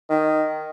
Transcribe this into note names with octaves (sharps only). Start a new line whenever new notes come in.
D#3